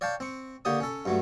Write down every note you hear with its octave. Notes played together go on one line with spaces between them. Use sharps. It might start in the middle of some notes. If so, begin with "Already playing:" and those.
C#5 D5 F5 G5 A5
C4 C#6
D3 A#3 G4 C#5 D#6
C#4 A4
G2 F#3 A3